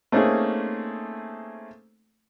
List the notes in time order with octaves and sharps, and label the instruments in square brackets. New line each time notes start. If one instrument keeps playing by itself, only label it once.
[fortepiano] A3 A#3 C4 C#4 D#4 G#4